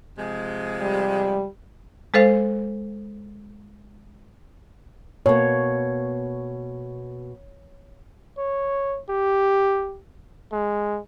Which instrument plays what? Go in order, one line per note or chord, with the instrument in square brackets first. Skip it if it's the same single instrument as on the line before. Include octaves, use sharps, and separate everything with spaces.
[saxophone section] C3 F3 G#3
[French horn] G3
[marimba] G#3 A4 C5 F5
[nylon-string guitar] B2 A#3 [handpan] C#5
[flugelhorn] C#5
G4
G#3